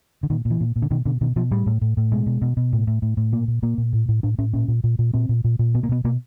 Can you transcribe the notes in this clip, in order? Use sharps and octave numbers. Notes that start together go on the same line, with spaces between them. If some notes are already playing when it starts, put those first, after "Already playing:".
D3
A#2 D#3
A#2
E3
A#2
A#2
D3
B2 D#3
B2 D3
B2 D#3
B2 F3
A2 G3
A2
A2
A2
B2 G#3
B2
B2
B2
A2
A2
A2
A2
A#2 A#3
A#2
A#2 A#3
A#2
A2
A2
A2 D4
A2 C#4
A#2 C#4
A#2
A#2
A#2
A#2 C4
A#2
A#2
A#2
B2 B3
A#3
B2 B3
B2 A#3